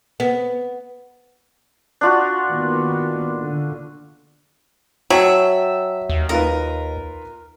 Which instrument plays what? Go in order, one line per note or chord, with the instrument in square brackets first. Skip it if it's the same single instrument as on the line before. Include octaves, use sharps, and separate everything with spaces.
[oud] B3
[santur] D4 F4 F#4
[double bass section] D#3 A#3 B3
D3
[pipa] F#3 [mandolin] E5 [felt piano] G5 A5
[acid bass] D#2
[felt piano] D#4 F4 B4 [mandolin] A#4